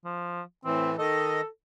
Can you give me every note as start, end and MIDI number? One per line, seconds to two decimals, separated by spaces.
0.05 0.42 53
0.65 0.96 45
0.65 0.96 52
0.65 0.91 60
0.99 1.41 51
0.99 1.47 69
0.99 1.41 75